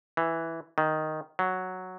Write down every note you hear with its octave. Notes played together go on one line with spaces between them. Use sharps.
E3
D#3
F#3